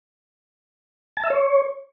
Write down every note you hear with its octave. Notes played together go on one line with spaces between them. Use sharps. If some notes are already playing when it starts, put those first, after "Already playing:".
A5
E5
C#5